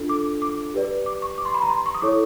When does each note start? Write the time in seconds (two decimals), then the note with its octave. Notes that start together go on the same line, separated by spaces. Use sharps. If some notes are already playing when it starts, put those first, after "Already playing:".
Already playing: D4 F4 A4
0.09 D6
0.42 D6
0.74 G4 B4 D5
1.06 D6
1.22 C#6
1.38 D6
1.45 C6
1.54 B5
1.62 A#5
1.70 C6
1.86 C#6
1.95 D#6
2.02 E4 A4 C#5 D6